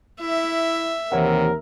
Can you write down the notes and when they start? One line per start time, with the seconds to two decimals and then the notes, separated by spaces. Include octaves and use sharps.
0.21 E4 E5
1.12 D#2 C3 E3 A#4 C#5 F#5